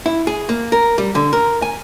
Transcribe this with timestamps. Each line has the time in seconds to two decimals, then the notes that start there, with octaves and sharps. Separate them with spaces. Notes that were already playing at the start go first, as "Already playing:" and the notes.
0.06 E4
0.27 G#4
0.49 A#3
0.72 A#4
0.98 G3
1.15 D3
1.33 A#4
1.62 G#5